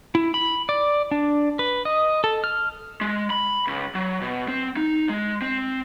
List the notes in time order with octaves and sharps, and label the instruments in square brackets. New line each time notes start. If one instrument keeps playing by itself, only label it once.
[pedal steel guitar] E4
B5
D5
D4
B4
D#5
A4
F6
[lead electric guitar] G#3
B5
C#2
F#3
B2
C4
D#4
G#3
C4